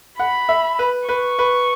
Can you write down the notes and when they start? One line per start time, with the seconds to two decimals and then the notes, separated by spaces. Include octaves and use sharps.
0.20 F#5 B5
0.49 E5
0.79 B4
1.09 B4 C#6
1.39 B4